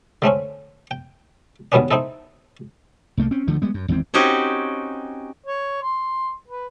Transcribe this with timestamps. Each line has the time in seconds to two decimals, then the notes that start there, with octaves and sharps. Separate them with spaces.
0.22 D3 A3 C4 C#4
0.91 G5
1.72 D#2 B2 G3 B3 C#4 D4
1.91 C4 D#4 E4 A4
3.17 C2 A3 A#3
3.31 C4 C#4
3.47 D2 D3 F3 A3
3.62 G3 G#3 B3
3.74 F#2
3.88 G#1 E2 G#2 C4
4.14 C4 C#4 D#4 F#4 G4
5.46 C#5
5.82 C6
6.48 B4